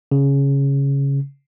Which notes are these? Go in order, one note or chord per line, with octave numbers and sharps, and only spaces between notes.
C#3